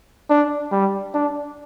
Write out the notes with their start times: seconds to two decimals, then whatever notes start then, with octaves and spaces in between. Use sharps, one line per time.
0.30 D4
0.72 G3
1.14 D4